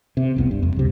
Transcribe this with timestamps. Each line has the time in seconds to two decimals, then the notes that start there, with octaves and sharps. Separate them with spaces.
0.17 C3
0.36 F1 C2 B3
0.51 G2
0.62 F2
0.76 C#2 C3